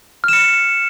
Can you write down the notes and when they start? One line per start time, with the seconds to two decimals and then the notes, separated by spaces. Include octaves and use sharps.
0.24 F6
0.28 E7
0.33 C#7